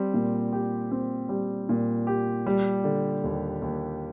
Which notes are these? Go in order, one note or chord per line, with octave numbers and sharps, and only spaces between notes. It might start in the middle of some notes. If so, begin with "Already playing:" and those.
Already playing: G3 C4
A#2
G4
C4
G3
A#2
G4
G3
D3
D#2
D#2